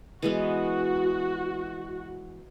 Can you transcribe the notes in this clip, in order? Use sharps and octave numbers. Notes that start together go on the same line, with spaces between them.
E3 G#3 B3 F#4